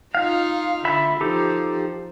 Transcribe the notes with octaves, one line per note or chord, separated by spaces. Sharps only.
D#4 F4 F5
D3 E5 B5
F3 D#4 G4 A4